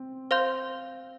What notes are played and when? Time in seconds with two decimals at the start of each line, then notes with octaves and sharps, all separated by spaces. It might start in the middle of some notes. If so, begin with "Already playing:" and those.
Already playing: C4
0.31 C5 F5 C6 G6